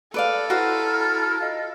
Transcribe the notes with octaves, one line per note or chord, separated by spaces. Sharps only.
A4 B4 D5 F5
E4 F#4 B4 C5 A#5 F6
F4 D#5 F5